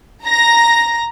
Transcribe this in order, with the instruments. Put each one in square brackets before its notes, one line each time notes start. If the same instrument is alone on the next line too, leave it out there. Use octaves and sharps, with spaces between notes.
[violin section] A#5 A#6